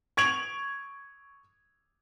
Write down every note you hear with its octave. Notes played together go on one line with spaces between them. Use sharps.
C#6 G#6 D7 F7 F#7